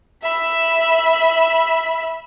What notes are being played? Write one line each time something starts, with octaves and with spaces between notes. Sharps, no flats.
E5 B5